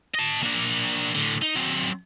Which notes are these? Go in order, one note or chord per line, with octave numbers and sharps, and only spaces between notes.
D#5 A5
A#3 D4
A2 D3
D#4
F#3 C4